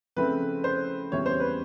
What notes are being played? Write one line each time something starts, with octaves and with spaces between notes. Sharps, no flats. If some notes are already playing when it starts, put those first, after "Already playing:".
C#3 F3 A3 C4 E4 B4
C5
E2 C#3 E3 G3 C4 C#5
C5
B4